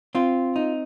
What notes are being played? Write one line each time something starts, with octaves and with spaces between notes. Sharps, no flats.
C4 F4
D#4